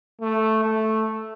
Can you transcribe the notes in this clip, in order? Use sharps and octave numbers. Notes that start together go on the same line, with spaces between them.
A3
A3